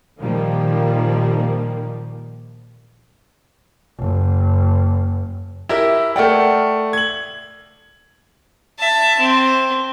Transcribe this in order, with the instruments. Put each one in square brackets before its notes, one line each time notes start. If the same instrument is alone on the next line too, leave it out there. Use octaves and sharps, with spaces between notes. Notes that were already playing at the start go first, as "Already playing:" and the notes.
[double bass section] A#2 D#3 F3 G3 A#3
[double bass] F#1
[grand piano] E4 [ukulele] G4 A#4 E5
[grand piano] A3 F#5 [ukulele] A#4 D5 G5
[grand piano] G#6 F#7
[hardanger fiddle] E5 A5
C4